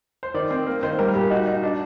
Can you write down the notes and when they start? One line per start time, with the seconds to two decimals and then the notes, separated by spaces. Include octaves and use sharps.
0.23 C5
0.34 D#3 D5
0.51 C4
0.67 A#3
0.83 D#3 C5
0.99 G3 A#4
1.15 A#2 G4
1.30 D#4 F#4
1.47 D#4
1.63 D4